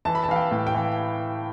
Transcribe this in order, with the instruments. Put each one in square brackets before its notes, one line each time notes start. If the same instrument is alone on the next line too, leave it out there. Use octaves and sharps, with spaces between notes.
[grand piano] E3 [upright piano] A5
[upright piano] B5
A5
[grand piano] E3 [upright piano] F5
[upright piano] G5
[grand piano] A2
[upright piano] G5
[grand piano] E3